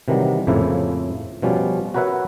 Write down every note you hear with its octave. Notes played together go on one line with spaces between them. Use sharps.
C3 D#3 E3 F#3 G3
F2 A2 C#3 F3 A#3 E4
B2 F3 G3 C#4
F#4 A#4 B4 C#5 E5 F#5